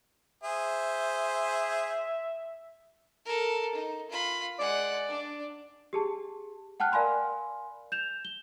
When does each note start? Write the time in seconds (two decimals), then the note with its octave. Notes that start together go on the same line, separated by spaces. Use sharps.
0.43 G#4 C5 E5
3.25 A4 A#4
3.75 D#4
4.10 F4 B5
4.59 G#3 D5 F#5
5.08 D4
5.93 G4 G#4 A5
6.80 F#5 G5 A5 F6 F#6
6.92 A#4 D5 F5 G#5 B5 C6
7.92 G6 E7 F7
8.25 G7